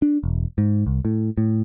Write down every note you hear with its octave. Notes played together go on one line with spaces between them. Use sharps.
D4
E1
G#2
C2
A2
A2